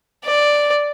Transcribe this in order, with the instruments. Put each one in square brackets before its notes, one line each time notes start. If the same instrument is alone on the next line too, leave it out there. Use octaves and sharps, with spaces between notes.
[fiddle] D5